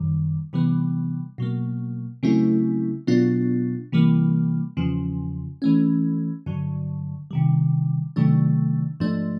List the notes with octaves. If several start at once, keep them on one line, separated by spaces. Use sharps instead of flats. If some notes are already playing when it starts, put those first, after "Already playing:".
Already playing: F#2 D#3 G3
C3 E3 G3 B3
B2 F#3 A#3
C#3 F#3 A3 C4 E4
B2 F#3 B3 D4 F4
C3 E3 G3 A#3
E2 C#3 F3
E3 A3 C#4
G2 D3 F#3
C3 D#3 G3
C3 D#3 F#3 A3 D4
G#2 F3 A3 D4